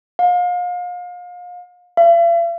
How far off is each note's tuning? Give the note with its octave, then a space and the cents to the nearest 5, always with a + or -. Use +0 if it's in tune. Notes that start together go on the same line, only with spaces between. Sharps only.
F5 +35
F5 -45